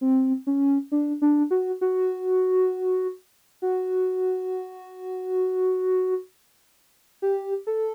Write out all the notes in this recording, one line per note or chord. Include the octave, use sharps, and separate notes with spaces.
C4
C#4
D4
D4
F#4
F#4
F#4
G4
A4